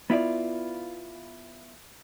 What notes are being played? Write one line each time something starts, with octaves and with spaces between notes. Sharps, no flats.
B3 E4 F4 D5